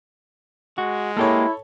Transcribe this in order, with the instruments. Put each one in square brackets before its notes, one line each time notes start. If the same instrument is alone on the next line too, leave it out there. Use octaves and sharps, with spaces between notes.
[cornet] G#3 [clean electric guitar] F#4
[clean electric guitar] A#3 G4 [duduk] E4 [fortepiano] A4 C#5